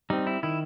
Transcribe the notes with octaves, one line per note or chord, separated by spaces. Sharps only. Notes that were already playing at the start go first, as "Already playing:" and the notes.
G3 C4 D#4
E4
D#3 E4